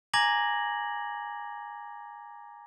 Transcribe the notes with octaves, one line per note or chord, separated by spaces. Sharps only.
G#5 A#5 D6 G#6 A#6 F#7